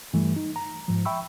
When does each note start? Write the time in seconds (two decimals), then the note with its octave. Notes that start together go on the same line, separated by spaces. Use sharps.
0.13 G2 E3 G3 A3
0.36 D#4
0.56 A#5
0.88 G#2 F3
1.05 E5 G5 B5 C#6 E6